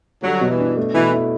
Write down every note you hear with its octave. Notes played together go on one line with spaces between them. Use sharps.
D3 F#3 G3
B2
E3
D4
A3
B2 E3
E4